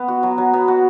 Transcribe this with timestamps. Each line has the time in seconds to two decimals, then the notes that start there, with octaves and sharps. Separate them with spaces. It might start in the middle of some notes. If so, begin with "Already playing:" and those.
Already playing: B3
0.08 F#4
0.23 F#3
0.38 F#3
0.53 B3
0.68 F#4